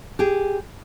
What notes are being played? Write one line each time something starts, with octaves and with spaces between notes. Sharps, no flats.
G4 G#4